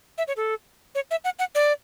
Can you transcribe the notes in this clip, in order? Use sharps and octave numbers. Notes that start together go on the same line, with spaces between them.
E5
C#5
A4
C#5
E5
F#5
F#5
D5